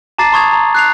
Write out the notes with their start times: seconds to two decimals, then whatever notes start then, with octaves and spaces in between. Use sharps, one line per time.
0.18 A5 A#5 D6 A6 C7 D#7
0.32 A5 C6 C#6 D#6 G#6 F7
0.52 A#5
0.75 F#6 C7 F7